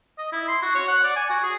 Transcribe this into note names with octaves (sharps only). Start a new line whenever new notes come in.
D#5
E4
C6
F#4
C#5
F#5
D5
G#5
F#4
G#4